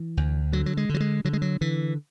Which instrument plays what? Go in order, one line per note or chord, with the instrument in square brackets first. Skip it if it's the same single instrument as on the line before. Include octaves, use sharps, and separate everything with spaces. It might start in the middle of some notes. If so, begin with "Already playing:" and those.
Already playing: [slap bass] E3
D2
D3 F#3
F#3
G#3
D3 F#3
G#3
D3 F#3
G#3
F#3
D3 E3